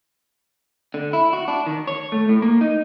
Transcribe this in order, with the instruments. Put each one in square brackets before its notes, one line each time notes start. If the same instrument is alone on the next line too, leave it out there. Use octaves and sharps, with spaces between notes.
[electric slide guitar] D3
E4
F#4
D4
D#3
C#5
A3
A2
A#3
D#4